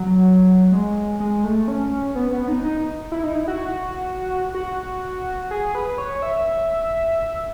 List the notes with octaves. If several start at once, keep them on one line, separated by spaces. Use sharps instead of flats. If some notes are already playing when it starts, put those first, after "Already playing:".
Already playing: F#3
G#3
G#3
A3
C#4
B3
B3
D#4
D#4
E4
D#4
E4
F#4
F#4
G#4
B4
C#5
E5